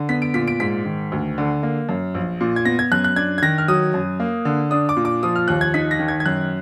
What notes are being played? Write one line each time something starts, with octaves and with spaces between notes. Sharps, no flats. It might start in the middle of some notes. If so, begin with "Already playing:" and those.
Already playing: D3
B3 B6
D7
A#2 B6
D7
G#2 B6
D#3
D2
D3
A#3
F#2
A#1
A#2
G#6
B3 A#6
G#6
F#2 F#6
F#6
D4 G#6
G#6
D#3 A#6
F6
F#3 D#6
F#2
A#3
D3
D4 D#6
D6
A#2
D6
F3 D#6
F6
D#2 F#6
G#6
D#4 B6
A#6
D#3
G#6
G#6
F#2 F#6